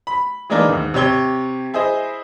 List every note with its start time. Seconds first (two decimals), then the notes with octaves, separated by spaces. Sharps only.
0.07 B5
0.50 E3 G#3 A#3 D4 D#4 A#4
0.69 D#2 G#2
0.94 C3 G4 C#5 G7
1.74 E4 G#4 C5 D#5